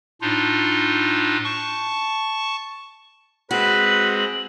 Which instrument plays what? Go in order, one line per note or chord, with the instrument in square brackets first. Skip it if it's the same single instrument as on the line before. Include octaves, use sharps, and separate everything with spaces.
[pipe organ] A2 D4 D#4 F4
A5 C#6
[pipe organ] G#3 C4 [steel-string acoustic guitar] F#4 [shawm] B4 [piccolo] F#7